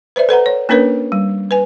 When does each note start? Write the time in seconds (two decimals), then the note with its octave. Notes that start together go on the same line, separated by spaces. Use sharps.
0.16 B4 C5 D5 E5
0.29 A4 B4 F#5 A#5
0.46 C#5
0.69 A#3 C#4 D4 A#4 B4 C#5
1.12 G3
1.51 B4 G#5